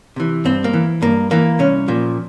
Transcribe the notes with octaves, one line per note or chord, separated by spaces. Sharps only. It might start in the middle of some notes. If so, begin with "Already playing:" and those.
C3 E3
G2 C4
A#3
E3
G2 A#3
E3 A#3
C2 C#4
A#2 F3